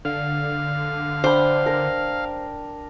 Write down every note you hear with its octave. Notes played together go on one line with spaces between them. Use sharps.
D3 F5
D4 C5 G5 B5
A#4